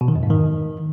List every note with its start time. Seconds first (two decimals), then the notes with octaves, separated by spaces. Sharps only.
0.01 B2
0.08 D#3
0.16 F2
0.23 G#2
0.30 D#3